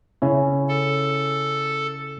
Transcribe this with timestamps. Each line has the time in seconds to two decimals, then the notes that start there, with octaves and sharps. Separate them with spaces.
0.22 C#3 C#4 E4
0.68 A4